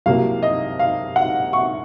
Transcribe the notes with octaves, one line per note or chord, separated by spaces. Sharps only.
C2 C3 F#3 A#3 F5
D#5
F5
F#5
C#6